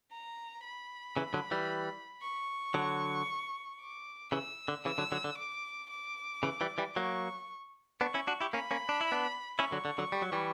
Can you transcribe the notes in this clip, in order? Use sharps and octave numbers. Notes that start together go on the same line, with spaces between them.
A#5
B5
C#3 E3
D3 F#3
E3 G3
C#6
D3 F#3
D6
C#3 E3 E6
D3
C#3 E3 E6
D3 F#3
D3 F#3
D3
D6
D6
C#3 E3
E3 G3
E3 G3
F#3 A#3 C#6
B3 D4 C#6
C#4 E4
D4 F#4
E4 G4
A#3 C#4 B5
A#3 C#4
D4
E4
B3 D4
C#4 E4 C#6
D3 F#3
D3
D3 F#3
G3
F#3
E3 G3